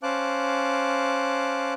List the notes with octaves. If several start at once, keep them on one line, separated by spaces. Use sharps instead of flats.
C#4 C5 F5 A5 D6 F#6